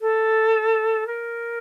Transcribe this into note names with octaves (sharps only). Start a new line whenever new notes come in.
A4
A#4